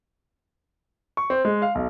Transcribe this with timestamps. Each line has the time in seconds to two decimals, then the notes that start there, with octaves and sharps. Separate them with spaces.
1.17 C#6
1.30 C4
1.45 G#3
1.62 F5
1.75 B1